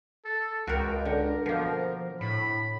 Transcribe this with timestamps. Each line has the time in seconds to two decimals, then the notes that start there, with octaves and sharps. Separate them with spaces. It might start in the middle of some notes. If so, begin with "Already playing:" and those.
0.25 A4
0.67 C#2 F#4 A#4 G5
1.05 D3 A#4
1.46 B2 F3 A#3
2.21 A2 B5